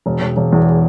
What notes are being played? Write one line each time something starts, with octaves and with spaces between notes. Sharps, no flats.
E1
E1
E1
E2